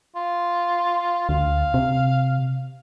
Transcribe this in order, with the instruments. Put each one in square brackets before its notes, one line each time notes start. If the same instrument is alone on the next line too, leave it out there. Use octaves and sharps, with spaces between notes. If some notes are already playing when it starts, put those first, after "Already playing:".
[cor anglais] F4
[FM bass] D2 [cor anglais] F5
[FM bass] C3